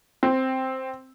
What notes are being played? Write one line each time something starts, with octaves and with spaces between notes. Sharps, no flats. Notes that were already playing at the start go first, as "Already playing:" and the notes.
C4